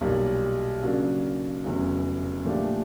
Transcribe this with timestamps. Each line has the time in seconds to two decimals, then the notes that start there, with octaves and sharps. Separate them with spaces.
0.01 B1 A#2 G3 A#3
0.82 C#3 F#3 A#3 D4
1.64 F1 E2 C#3 F#3
2.44 A#2 F3 A3 D4 G4